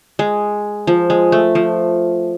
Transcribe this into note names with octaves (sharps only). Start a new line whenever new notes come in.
G#3
F3
G#3
A3
F3